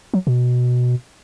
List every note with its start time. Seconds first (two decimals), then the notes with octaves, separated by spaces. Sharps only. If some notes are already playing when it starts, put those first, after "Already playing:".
0.14 F#3
0.27 B2